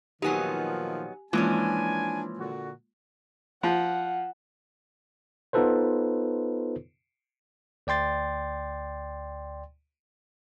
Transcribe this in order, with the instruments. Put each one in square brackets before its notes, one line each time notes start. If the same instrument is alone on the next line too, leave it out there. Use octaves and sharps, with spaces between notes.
[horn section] A#2 D#3 F3 [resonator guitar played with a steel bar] F#3 B3 D#4 [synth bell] G4 G#5
[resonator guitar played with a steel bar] E3 F3 C#4 [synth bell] G#3 A#3 F4 [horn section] D4 G#5
[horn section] A#2 D3 F#4
[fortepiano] F3 [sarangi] F#5
[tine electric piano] B3 D#4 F4 A4 B4 C5
D2 D5 G5 C6 A6